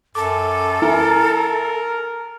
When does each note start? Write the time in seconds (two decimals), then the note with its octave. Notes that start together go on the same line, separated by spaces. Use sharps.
0.15 F#2 A4 D6
0.82 E4 A#4 G#5 A#5